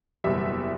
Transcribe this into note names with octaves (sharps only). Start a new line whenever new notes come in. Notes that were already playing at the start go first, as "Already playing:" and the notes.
F#1 E2 B2 G3 E5